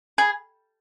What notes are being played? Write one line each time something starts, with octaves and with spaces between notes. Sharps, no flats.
G#4